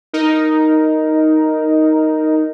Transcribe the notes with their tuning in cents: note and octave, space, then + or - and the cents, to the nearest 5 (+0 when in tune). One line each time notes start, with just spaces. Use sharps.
D#4 +5 A#4 +0